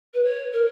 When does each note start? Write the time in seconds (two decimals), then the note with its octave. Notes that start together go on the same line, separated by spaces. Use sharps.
0.14 B4
0.24 C#5
0.53 A#4